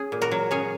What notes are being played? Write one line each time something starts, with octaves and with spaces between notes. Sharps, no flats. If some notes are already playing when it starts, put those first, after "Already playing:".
Already playing: C#4 G#4
A#2
F#4 A#4
F#3
C#4 G#4 C#5